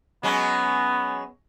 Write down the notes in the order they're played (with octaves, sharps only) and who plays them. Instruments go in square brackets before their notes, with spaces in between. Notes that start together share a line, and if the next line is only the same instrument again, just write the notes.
[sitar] F#3 G#3 C#4 [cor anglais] B3